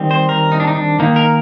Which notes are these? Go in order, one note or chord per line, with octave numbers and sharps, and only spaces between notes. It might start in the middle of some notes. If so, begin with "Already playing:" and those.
Already playing: D#3 G3 C4
C5
A#4
D#4
D4
D#4
D4
D#3 A#3 D#4
A#4